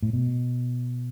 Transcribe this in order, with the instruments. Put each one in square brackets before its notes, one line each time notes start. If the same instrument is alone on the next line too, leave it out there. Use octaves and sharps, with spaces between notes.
[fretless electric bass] A2
B2